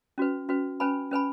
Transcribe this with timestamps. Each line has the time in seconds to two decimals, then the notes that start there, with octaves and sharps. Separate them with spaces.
0.18 C#4 F#4 B4
0.49 C#4 F#4 B4
0.80 C#4 B4 G#5 B5
1.11 C#4 B4 G#5 B5